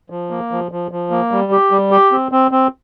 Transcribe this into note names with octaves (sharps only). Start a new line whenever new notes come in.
F3
A#3
F3
F3
F3
A#3
G3
G4
G3
G4
C4
C4
C4